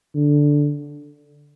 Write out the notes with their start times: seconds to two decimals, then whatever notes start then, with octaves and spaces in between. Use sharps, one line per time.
0.15 D3